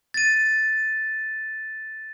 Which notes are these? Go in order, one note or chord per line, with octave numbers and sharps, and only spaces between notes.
A6 D#7